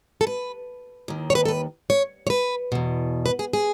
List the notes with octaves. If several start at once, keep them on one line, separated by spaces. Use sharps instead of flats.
A4
B4
D#2 D#3
C#5
B4
A4
B4
C#5
C#5
B4
E2 B2
B4
G#4
G#4